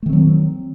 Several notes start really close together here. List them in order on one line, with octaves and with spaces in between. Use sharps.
A3 D#3 C4 F#3